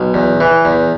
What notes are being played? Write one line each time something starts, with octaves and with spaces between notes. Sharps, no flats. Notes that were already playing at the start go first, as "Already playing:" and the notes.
Already playing: B1
E2
E3
E2